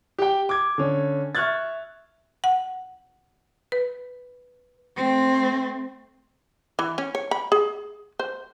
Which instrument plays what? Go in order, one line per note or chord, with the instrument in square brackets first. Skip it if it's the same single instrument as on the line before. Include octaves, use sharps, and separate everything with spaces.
[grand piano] G4 G5
D6 G#6
D3 C#4
E5 C#6 F6 F#6 G#6 A6
[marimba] F#5
B4
[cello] A3 C4
[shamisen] E3
C#4
C#5
B5
G#4
C5